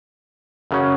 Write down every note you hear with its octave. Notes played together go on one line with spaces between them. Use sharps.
F#2 C#3 F#3 C#4